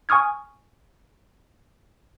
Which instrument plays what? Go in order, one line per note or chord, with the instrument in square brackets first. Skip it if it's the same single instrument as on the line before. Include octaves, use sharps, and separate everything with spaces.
[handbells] G#5 C#6 D#6 F6 G#6